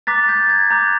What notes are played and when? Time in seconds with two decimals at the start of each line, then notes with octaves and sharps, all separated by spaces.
0.07 A#5 D6 F#6 A6 B6
0.29 G6 A6
0.50 G#6
0.71 A#5 D6 F#6 G6